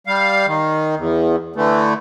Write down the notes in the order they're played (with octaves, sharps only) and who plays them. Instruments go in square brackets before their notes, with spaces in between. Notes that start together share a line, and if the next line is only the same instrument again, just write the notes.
[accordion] G3 F5
D#3
E2
D3 E3 A3